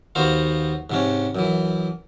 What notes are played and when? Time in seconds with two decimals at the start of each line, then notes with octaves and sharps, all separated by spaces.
0.15 D#2 B3 F#4 C5 F5
0.90 G#2 C3 C#4
1.35 F#2 E3